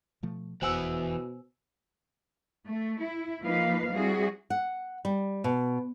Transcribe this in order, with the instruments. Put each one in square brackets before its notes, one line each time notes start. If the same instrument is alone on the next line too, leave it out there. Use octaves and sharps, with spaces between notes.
[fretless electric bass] B2 F3 A3
[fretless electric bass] F1 E2 [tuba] B2 [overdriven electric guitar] E3 F#5 [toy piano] C5 G#5 E6
[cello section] A3
E4
F3 A#3 D#4 B4 F5
G3 C4 E4 F#4 G#4
[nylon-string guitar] F#5
G3
B2